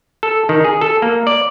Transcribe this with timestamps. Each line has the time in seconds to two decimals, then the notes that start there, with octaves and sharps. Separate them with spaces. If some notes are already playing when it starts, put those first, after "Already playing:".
0.23 A4
0.49 D#3
0.64 G#4
0.81 A4
1.02 A#3
1.27 D5